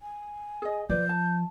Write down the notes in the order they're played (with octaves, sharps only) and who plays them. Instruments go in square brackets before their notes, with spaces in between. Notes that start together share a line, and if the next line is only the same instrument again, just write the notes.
[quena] G#5
[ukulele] G#4 D#5
[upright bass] F3 [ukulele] B4 D5 [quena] G6
[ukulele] A5